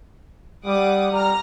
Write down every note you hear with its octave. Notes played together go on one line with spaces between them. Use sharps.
G3 F#5 D6 D#6
G3 A#5 F6